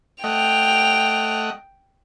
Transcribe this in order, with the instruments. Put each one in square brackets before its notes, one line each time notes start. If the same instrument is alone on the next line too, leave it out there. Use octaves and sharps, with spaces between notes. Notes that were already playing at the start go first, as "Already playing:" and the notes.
[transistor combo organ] A3 D#5 F#5 [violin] G5 F7